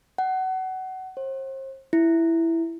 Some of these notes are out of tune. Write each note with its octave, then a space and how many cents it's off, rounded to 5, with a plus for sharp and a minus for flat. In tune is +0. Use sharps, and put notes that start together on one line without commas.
F#5 +25
C5 +40
E4 +5